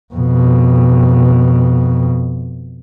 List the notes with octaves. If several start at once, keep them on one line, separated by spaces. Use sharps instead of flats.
F2 B2